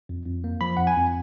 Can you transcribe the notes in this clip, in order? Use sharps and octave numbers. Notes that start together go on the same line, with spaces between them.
F2
F2
A#3
F3 B5
F2 F#5
G#5
F2